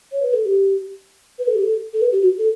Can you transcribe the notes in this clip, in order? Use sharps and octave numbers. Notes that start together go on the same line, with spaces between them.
C#5
B4
A4
G4
B4
A4
G4
A4
A4
B4
G4
F#4
A4